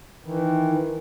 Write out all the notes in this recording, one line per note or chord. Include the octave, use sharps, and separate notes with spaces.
D#3 E3